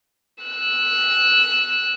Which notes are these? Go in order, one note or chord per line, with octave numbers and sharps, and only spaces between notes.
E6 F#6